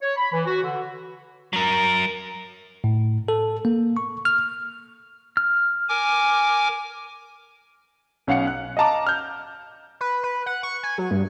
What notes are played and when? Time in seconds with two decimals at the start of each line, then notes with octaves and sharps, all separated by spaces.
0.01 C#5
0.16 B5
0.33 E3
0.46 F#4
0.62 D3
1.53 F#3 A#4
2.84 A2
3.28 A4
3.65 A#3
3.97 C#6
4.25 F6
5.37 F6
5.89 A#4 G#5 D6
8.27 B1 C#4 F5 F#5 C#7
8.47 F#6
8.77 D#5 F5 A5 A#5 D6
9.07 F6 G6
10.01 B4
10.23 B4
10.46 F#5
10.63 C#6
10.83 G#5
10.98 F#3
11.11 G2